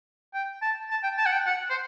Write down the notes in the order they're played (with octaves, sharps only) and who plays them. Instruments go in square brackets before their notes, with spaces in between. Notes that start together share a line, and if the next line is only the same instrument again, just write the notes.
[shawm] G5
A5
A5
G5
A5
F#5
G5
F#5
C5